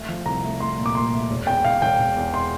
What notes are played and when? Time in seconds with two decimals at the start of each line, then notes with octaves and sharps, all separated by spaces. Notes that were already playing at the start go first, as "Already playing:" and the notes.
Already playing: A3
0.09 F3
0.26 C2 A#5
0.43 A3
0.60 A3 C6
0.78 A#2
0.86 D6
0.95 A#2 C6
1.13 A3
1.29 E1
1.47 E2 G5
1.65 E1 F5
1.81 E1 G5
1.99 E1
2.17 E2
2.34 C6